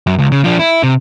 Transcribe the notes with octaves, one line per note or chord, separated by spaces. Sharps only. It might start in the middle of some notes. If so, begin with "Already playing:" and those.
F#2
C#2
C#3
F3 D4
E4
C3